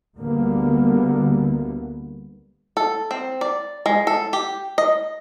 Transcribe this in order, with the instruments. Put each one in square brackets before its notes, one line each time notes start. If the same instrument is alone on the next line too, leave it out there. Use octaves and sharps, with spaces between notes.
[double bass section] D2 D3 G3 A#3 B3
[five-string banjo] A4
C4
D5
G#3
A4
G4
D#5